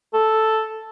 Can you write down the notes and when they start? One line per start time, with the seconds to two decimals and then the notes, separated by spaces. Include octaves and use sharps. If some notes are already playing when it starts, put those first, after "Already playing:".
0.14 A4